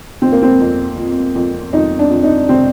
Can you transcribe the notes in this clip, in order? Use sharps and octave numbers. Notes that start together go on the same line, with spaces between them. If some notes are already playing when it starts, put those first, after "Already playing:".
F2 C4
A#3
C4
F2
F3
F2
F2 D#4
D4
F2
D#4
C3 C4